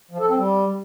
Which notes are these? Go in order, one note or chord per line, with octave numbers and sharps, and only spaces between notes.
F3
A4
C4
G3